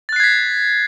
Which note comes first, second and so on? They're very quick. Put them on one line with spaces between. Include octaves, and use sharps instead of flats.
A6 F#6 C7 G#6 B6